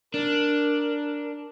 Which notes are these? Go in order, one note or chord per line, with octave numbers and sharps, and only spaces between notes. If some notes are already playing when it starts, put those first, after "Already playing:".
D4 A#4